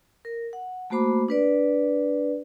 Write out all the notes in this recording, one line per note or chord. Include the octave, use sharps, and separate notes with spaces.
A#4
F#5
A3 A#3 F#4 C5 B5 D6
D4 B4 D5